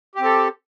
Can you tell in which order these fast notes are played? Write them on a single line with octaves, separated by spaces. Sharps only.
G4 C4 A4